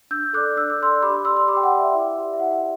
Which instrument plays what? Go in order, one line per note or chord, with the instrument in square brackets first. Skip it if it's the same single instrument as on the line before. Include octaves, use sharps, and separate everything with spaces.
[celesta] D4 E6 G6
A4 D5 D6 F#6
D4 E6
D6
A4 D5 C6 E6
G4 B5 D6
D5 C6 E6
C6
G4 B5 D6
G5
F#5
D5
E5
E4
G4 D5
E5
E4 F#5
F#5